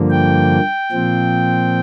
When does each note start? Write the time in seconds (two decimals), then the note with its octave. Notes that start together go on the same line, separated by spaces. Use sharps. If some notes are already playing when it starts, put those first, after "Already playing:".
Already playing: G2 D3 F3 A#3
0.10 G5
0.92 A#2 F3 C4